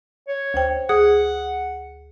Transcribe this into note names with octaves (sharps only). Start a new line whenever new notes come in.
C#5
D2 C5 G5
G#4 F#5 D#6